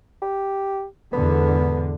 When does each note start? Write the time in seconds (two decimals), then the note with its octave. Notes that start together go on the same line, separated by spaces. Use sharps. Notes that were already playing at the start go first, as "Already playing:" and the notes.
0.22 G4
1.13 E2 G#2 D3 B3